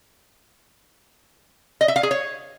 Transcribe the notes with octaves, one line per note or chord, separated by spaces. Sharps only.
D#5
E5
F5
G#4
C#5